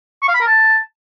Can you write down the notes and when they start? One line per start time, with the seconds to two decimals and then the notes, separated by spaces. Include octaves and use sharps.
0.22 C#6
0.29 F5
0.35 B5
0.41 A#4
0.47 A5